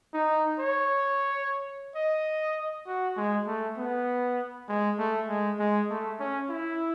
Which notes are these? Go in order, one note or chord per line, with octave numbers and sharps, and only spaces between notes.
D#4
C#5
D#5
F#4
G#3
A3
B3
G#3
A3
G#3
G#3
A3
C#4
E4